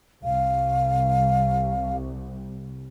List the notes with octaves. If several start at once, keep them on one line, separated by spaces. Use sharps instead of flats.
C2 F5